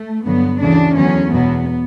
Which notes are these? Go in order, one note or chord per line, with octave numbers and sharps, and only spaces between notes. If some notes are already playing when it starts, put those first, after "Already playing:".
Already playing: A3
G2 D3 F#3 B3
D2 C#3 E3 D4
E2 D3 F#3 C#4
E2 B2 F#3 B3